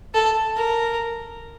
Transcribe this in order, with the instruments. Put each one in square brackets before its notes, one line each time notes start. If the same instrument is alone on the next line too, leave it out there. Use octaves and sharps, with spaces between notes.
[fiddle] A4
A#4